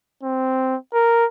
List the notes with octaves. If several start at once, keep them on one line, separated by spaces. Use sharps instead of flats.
C4
A#4